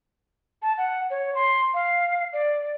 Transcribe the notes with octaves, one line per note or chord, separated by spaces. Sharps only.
A5
F#5
C#5
C6
F5
D5